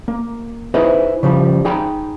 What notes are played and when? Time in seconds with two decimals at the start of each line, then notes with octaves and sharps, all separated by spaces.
0.08 A#3
0.74 D#4 E4 G#4 B4 C5 D#5
1.23 C#3 F3 G3
1.65 D#4 G#4 G5 A#5 B5